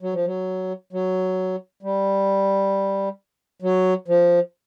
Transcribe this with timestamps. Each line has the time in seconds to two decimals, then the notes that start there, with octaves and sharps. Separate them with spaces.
0.02 F#3
0.14 F3
0.26 F#3
0.93 F#3
1.83 G3
3.62 F#3
4.08 F3